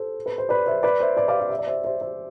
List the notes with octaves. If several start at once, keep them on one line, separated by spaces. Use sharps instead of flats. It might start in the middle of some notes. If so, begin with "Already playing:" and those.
Already playing: A4 C5
B4
C5
B4 D5
C5 E5
B4 D5
C5 E5
B4 D5
D5 F5
F5
E5
D5
C5 E5
C5 E5
C5 E5